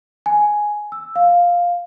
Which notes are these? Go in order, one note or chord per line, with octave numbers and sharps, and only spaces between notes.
G#5
E6
F5